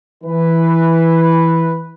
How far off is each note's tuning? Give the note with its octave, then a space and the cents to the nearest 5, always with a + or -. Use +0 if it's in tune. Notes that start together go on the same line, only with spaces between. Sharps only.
E3 +0 B4 +0